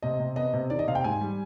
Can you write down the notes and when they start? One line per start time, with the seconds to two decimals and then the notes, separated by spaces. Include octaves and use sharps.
0.03 C3 D#5
0.19 C3
0.36 B3 D#5
0.54 C3
0.70 D#3 D5
0.79 D#5
0.88 C3 F5
0.95 G5
1.04 G#2 G#5
1.21 G3